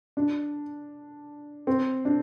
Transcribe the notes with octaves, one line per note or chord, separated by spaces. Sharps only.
D4
C4
D4